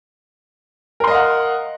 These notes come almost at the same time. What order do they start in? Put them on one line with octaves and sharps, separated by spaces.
A#4 C6 D#5 F5 F#5